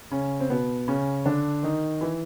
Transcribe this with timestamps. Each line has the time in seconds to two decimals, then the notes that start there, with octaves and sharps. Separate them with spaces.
0.11 C#3 C#4
0.40 C4
0.50 B2 B3
0.88 C#3 C#4
1.26 D3 D4
1.63 D#3 D#4
2.01 E3 E4